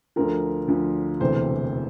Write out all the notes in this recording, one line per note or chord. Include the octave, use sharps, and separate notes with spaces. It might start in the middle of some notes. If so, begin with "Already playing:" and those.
D2 D3 F3 A#4
D2 D3 F3
E1 D2 C3 E3 C5